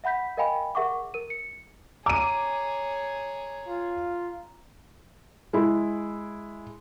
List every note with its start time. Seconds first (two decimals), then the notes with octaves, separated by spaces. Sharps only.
0.04 E5 F#5 B5 G6 B6
0.37 A#4 D#5 F5 G5 G#5 B5
0.75 G#4 A#4 E5 F#5 C#6 D6
1.14 A#4 D#7
1.30 C#7
2.06 G#4 C#5 A#5 D6 D#7
3.68 F4
5.53 G#3 E4